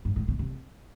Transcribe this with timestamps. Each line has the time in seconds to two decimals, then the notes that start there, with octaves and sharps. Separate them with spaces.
0.05 G2
0.16 A2
0.28 B2
0.39 C3